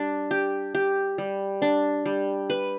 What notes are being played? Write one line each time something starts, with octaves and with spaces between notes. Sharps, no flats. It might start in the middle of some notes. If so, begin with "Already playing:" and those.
Already playing: G3 D4
G4
G4
G3
D4
G3
B4